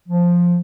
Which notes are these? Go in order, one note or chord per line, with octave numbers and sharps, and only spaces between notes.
F3